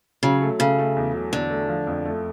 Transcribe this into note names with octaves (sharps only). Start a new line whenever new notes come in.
C#3 F#3
A3
C#3 A3
A3
E2
F#3
E2 D3
A3
F3
F2
A3